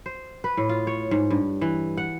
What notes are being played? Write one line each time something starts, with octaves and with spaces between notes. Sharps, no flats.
C5
B4
A2
F4
C#5
G#2
G2
E3
F#5